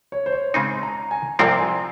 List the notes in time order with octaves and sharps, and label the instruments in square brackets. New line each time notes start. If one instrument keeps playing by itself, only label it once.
[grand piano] C#5
C5
C#5
[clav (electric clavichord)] C#3 G#3 C4 D#4 [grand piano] G#5
[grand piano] A#5
G#5
[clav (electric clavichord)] C2 C3 F3 C4 [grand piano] A#5
[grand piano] G#5